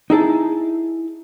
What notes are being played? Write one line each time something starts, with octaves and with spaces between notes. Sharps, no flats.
D#4 E4 G#4 A5